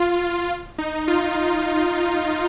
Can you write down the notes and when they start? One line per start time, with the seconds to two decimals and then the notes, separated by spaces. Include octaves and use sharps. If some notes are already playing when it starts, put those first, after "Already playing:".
Already playing: F4
0.78 D#4
1.08 F4